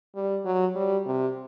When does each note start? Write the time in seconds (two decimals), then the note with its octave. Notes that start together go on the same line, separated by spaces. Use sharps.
0.15 G3
0.45 F#3
0.75 G3
1.06 C3